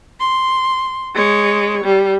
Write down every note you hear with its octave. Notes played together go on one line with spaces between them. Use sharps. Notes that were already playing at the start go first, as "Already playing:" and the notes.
C6
G#3 C#5
G3